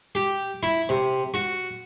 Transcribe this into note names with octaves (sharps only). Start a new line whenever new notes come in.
G4
E4
C3
F#4